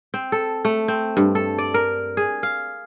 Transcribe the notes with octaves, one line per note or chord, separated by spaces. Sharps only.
C4
A4
A3
C4
G2
A4
D5
A#4
G#4
F5